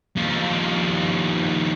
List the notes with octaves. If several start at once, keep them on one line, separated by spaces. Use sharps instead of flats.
D#2 F3